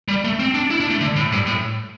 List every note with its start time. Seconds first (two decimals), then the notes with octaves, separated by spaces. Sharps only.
0.08 G3
0.24 A3
0.39 C4
0.54 D4
0.70 E4
0.80 D4
0.90 A3
1.01 D3
1.16 A2
1.32 G2
1.47 A2